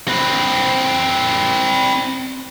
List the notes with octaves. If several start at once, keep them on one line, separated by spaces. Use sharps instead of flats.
C4 B4